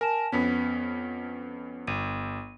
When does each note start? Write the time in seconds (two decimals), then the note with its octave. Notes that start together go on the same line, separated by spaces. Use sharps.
0.01 A#4 G#5 A5 E7
0.32 F2 B3 C#4 B6
1.87 G1 D#7